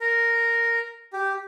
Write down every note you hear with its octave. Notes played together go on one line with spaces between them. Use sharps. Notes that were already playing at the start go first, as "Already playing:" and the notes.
A#4
G4